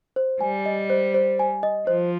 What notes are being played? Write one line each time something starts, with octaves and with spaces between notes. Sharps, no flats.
C5
G3 G#5
D#5
C5
C5
G#5
D#5
F3 C5